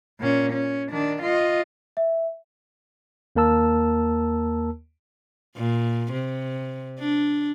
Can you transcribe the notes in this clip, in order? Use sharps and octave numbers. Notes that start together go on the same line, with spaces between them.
A#2 C#4
C#4
D#3 D4
F4 D#5
E5
D#2 A#3 A#4 A5 E6
A#2
C3
D4